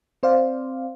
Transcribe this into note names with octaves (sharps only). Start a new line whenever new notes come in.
C4 C5 D5 F5